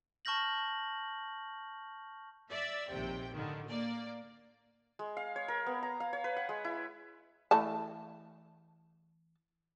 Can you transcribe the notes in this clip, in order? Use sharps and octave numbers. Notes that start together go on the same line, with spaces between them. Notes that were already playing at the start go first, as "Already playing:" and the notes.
A5 C#6 F6 G6 A#6 F#7
D5 E5 E6
A#1 D#2 C3 G5
A2 D3 D#3
A#3 D5
G#3
F5
C#5
A#4
B3
A#5
F5
C#5
B4
F#5
G#3
E4
E3 A3 A5